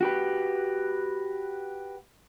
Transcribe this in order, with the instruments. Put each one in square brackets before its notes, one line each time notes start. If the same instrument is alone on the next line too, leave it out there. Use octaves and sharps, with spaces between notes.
[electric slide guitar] F#4 G4 B4